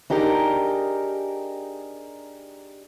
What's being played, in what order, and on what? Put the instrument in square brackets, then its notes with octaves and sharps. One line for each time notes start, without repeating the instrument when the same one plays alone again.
[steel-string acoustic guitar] D4 D#4 G4 G#4 A#4